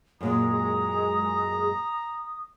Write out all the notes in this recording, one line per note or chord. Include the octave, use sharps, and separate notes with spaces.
F#2 A#2 G#3 A#5 D#6